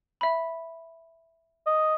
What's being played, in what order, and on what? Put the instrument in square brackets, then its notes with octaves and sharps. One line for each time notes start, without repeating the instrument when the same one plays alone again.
[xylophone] E5 B5
[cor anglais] D#5